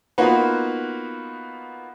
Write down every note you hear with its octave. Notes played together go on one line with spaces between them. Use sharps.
A#3 B3 D#4 F4 F#4 B4